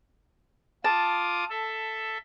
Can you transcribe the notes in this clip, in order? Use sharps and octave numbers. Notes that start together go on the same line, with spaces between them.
F4 A5 D6 D#6
A4 E5